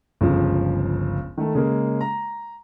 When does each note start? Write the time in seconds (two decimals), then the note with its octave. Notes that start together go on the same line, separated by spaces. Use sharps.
0.21 G1 C#2 C#3 F3
1.37 D#3 A3 A4
1.55 C#3 G#3 A#3
2.01 A#5